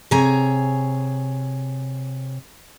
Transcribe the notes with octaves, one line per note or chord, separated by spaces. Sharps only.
C3 G#4 C#5 G#5 A#5